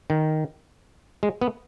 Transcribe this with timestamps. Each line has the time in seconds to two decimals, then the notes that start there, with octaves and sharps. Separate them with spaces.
0.10 D#3
1.23 G#3
1.41 B3